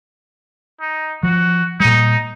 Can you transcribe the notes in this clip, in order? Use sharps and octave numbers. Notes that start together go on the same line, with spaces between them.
D#4
F3 F#4
A#2 G3 D#4